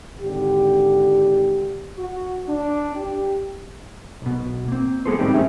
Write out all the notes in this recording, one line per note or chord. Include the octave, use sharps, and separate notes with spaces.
G#1 D3 G4
F#4
D4
G4
B1 B2
A#3 C4
G#3 B3 G#4 A4 B4 C5
A2 D#3 G3 C4 D#4 G4
A3 C#4 G#4 E5